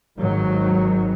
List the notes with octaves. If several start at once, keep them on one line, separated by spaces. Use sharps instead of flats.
G#1 G#2 D#3 F#3